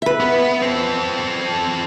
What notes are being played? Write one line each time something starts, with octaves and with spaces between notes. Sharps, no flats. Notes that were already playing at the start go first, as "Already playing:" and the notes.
B4 E5
B3
C4 A4